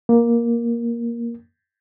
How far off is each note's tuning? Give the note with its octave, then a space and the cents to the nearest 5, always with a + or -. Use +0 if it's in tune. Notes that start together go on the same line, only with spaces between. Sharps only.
A#3 +10